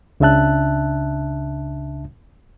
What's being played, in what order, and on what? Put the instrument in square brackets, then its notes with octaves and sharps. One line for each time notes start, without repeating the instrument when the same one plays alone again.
[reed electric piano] C#2 C#3 D4 E5 A5 F#6